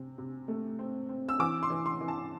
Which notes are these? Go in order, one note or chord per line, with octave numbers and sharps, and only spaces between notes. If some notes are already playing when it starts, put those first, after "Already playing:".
Already playing: C3 C4
C3
A3
C4
C4
E6
E3 D6
C6
E3
C6
E3
A5